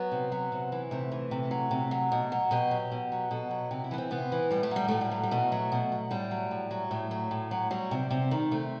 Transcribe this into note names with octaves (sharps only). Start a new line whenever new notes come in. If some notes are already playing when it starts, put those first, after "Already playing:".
Already playing: F#3 B3
C3
F#3
C3
E3
C3 A3
E3
C3
F#3
C3
F#3
B2
F#3
B2 G4
F#3
B2
F#3
B2 A4
F#3
C3 G4
E4
E3 B3
C4
C3 B3
E3
A2 G3
A3
F#3 G3
A2 A3
G3
F#3
G3
B2 A3
F#3
B2
F#3
A2 G3
F#3
A2
F#3
A2 A3
F#3
A2
F#3
F#3 G3
C3
C3
D#3
C3 A3